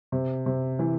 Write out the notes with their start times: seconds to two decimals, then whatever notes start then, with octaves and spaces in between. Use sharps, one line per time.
0.12 C3
0.46 C3
0.79 E3